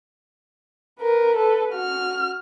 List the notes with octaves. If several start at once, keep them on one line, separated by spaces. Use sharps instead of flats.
A#4 B4
A4 B4
F#4 F6